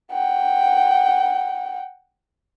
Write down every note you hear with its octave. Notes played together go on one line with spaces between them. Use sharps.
F#5 G5